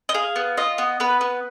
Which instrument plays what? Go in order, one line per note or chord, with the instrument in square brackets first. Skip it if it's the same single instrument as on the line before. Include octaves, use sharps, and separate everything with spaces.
[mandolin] D#5
G#4 F5
B3
F4 D#5
B3
B3 B4
B3